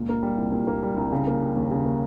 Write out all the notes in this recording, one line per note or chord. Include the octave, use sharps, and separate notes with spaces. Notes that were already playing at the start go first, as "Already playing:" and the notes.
Already playing: C#2 A#2
A#3
G3
C2
A#2
A#3
G3
C2
C#3
A#3
G3
D#2
C#3
A#3